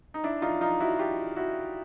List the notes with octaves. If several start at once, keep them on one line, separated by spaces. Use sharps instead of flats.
D#4
D4 E4
D#4 F4
D#4 F4
E4 F#4
F4 G4
E4 F#4